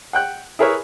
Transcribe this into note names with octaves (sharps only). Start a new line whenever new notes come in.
F#5 G5 F#6
E4 G#4 A#4 B4 C#5 E5